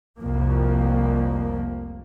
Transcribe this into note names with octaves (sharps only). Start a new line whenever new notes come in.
F1 C2 F2 F3 A#3